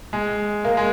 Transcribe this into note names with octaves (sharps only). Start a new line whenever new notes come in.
G#3
A#3
G#3